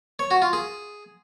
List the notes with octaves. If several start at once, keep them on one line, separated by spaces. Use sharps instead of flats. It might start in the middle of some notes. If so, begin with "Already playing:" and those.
C#5
F#4
F4
G#4